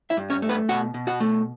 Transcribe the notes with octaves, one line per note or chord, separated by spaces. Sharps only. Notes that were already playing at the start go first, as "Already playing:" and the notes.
E4 E5
G2
C#4 C#5
A3
B3 B4
B2 F#4 F#5
B2
F#4 F#5
A3